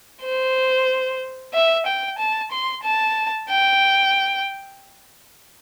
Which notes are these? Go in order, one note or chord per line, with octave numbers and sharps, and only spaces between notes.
C5
E5
G5
A5
C6
A5
G5